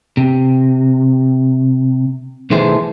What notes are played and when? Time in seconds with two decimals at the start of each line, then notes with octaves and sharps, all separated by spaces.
0.17 C3
2.50 B1 D#3 E3 A3 G#4 C5